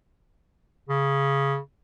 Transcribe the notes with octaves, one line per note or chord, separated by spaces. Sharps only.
C#3